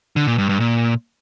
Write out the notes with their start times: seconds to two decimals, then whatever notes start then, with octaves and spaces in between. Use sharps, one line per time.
0.16 D3
0.27 A#2
0.38 G2
0.49 G2
0.60 A#2